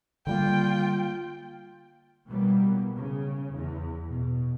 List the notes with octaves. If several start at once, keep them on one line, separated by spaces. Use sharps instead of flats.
D3 G3 A#3 F4 G5
B2 E3 F#3 G3 A#3 B3
C#3
E2
B2